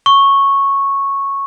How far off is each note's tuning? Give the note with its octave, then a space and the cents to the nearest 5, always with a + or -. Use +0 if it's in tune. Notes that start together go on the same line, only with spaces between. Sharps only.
C#6 -10